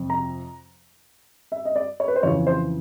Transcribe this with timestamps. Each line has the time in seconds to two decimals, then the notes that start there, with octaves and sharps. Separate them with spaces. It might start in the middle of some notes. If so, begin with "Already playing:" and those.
Already playing: F2 C3
0.10 A#5
1.52 E5
1.65 D#5
1.76 D5
2.00 C#5
2.08 B4
2.16 C5
2.23 F2 C#3 E3 C#5
2.47 C5